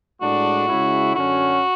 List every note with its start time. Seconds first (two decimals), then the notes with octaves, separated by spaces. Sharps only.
0.21 A2 G#3 D4 F#4
0.68 C#3 G#3 C#4 E4
1.15 F#2 D3 F#3 C#4 F#4